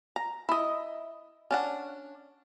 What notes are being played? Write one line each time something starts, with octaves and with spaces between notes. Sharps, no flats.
A#5
E4 D#5
C#4 D4 F#5